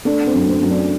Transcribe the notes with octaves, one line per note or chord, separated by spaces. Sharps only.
A3 D4
C4
F#2
C4
F#2
D4